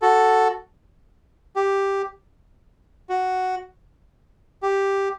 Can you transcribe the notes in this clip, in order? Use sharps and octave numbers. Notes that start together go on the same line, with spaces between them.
F#4 A4
G4
F#4
G4